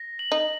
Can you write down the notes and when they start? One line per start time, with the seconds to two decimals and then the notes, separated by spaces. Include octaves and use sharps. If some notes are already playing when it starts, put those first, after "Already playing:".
Already playing: A#6
0.19 F#7
0.32 D#4